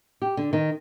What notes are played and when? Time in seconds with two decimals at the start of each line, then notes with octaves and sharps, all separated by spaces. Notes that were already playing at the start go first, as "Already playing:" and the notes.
0.22 G4
0.37 D3
0.53 D#3